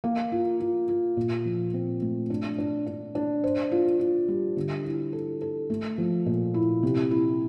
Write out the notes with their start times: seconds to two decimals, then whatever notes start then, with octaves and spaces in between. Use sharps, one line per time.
0.04 A#3
0.32 F4
0.60 F4
0.89 F4
1.17 A#2
1.45 F3
1.74 C4
2.02 A3
2.30 D4
2.58 D4
2.87 D4
3.15 D4
3.44 C5
3.72 F4
4.00 F4
4.28 G3
4.57 D3
4.85 E4
5.13 A4
5.41 A4
5.70 A3
5.98 F3
6.26 A#2
6.54 E4
6.83 C3
7.11 E4